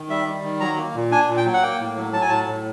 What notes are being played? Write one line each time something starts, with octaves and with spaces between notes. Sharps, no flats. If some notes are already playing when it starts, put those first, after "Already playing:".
Already playing: D#3
G3 E5
G3
D#3
F#3 A#5
A#3
A#2
D4 G#5
A#2
G5
F#3
F#5
A#3 G5
A2
F#3
F#3 A5
G#5
A2 A5
A2